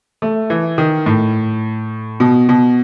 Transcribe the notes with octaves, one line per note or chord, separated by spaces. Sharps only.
A3
E3
D#3
A2
B2
B2